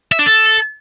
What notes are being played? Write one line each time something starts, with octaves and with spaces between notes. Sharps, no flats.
E5
D4
A4